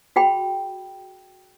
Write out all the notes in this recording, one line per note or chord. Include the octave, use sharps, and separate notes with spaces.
F#4 G#4 G5 B5